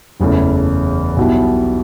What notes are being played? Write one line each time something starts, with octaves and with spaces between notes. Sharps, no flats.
F#1 E2 C#3 E3 A3
B1 B2 G3 B3 E4